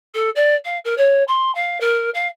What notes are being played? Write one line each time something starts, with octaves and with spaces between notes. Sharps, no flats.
A4
D5
F5
A#4
C#5
C6
F5
A#4
F5